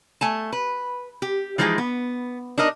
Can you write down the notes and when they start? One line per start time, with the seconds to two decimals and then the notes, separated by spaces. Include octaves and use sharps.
0.21 A3 G#5 A5
0.53 B4
1.22 G4
1.58 E3 F3 G#3 D#4 G4 G#4
1.78 B3
2.58 D4 D#4 A#4 D#5